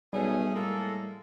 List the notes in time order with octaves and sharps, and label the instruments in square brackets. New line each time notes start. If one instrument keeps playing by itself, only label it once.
[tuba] B1 [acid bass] G3 [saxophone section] A3 C#4 G#4 [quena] G#5
[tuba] A2 [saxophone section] G#3 A#3 [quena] A4